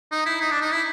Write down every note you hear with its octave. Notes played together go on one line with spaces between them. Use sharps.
D#4
E4
D#4
D4
D#4
E4